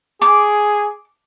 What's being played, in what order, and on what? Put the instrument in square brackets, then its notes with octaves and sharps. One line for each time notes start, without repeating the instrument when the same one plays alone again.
[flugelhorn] G#4 [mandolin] D6